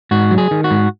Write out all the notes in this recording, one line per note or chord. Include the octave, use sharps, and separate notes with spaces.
G#2 F#4
F#3
G#4
D#3
F#4
G#2